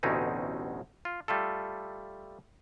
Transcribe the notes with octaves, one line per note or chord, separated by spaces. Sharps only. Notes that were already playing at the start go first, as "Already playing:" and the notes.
A1 D2 B2 C4 C#4 D#4
F4
G3 A3 F4 A4